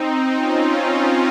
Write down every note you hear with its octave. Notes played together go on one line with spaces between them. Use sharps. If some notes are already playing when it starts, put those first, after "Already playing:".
Already playing: C4 D#4
C#4 F4
C4 D#4